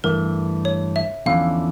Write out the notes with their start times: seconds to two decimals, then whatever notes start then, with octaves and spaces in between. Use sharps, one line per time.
0.04 G2 E3 A3 A#4
0.65 C#5
0.96 E5
1.26 E2 D3 F3 C#4 E4 F5